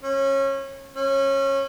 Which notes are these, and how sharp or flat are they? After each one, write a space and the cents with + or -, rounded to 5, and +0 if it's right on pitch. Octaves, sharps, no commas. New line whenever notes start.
C#4 -25
C#4 -25